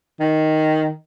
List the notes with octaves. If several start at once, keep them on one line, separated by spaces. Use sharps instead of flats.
D#3